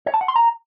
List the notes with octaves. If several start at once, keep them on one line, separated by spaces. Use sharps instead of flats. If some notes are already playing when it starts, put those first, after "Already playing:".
C#5
A5
F#5
C6
A#5